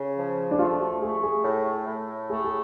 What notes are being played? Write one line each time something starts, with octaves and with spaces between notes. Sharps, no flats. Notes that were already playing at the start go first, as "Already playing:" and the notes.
Already playing: C#3
F3
D4
A3 F4
F#4
A3 G#4
G#4
A2
A2
A3 G#4
G#4